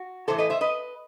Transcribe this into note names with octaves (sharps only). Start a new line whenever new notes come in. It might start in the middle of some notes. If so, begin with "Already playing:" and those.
Already playing: F#4
A2 E3 A4 C5
B4 D#5
C5 E5
B4 D#5